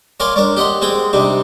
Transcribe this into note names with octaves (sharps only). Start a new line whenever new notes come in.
A#4 C#5 D5 F5 G#5 C6
D4 A#4 C#5 D5
G4 D#5 F#5 C6
G#3 C4 G#4 G5 D#6
C3 G3 D4 D#4